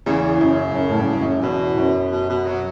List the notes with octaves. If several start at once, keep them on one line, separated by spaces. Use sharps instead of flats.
E2 C#3
F#2
F#2
A2
G2
G2
F#2
E2 B2
F#2
B2
B2
F#3